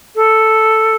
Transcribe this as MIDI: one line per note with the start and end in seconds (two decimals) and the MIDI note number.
0.15 0.96 69